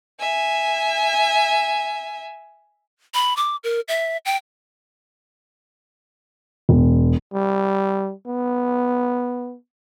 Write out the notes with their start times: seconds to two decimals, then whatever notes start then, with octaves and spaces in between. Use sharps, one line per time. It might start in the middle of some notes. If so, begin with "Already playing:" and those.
0.20 E5 G#5
3.14 B5
3.37 D6
3.64 A#4
3.88 E5
4.25 G5
6.69 E1
7.34 G3
8.26 B3